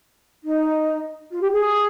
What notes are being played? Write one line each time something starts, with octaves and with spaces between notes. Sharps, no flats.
D#4
F4
G4
G#4